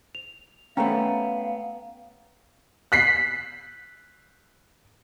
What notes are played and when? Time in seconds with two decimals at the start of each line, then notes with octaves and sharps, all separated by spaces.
0.15 F7
0.77 A3 B3 C#4 F5 G5 A#5
2.92 F#6 B6 C7